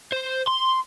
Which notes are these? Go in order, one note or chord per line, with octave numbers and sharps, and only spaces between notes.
C5
C6